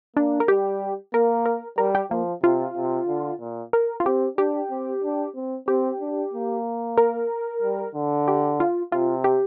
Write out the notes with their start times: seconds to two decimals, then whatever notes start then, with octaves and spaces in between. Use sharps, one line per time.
0.16 A#3 D4
0.40 A#4
0.48 G3 G4
1.13 A#3 A#4
1.46 A#4
1.78 G3 A#4
1.95 G4
2.11 F3 A#3
2.43 C3 F4
2.76 C3
3.08 D3
3.40 A#2
3.73 A#4
4.00 F4
4.05 C4 G4
4.38 D4 G4
4.70 C4
5.03 D4
5.35 C4
5.67 C4 G4
6.00 D4
6.33 A#3
6.98 A#4
7.62 G3
7.95 D3
8.28 G4
8.60 F4
8.92 C3 F4
9.24 G4